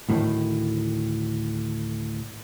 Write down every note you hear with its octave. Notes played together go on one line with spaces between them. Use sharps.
D2 A2 D#3